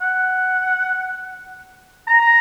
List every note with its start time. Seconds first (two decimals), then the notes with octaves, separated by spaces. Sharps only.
0.01 F#5
2.08 A#5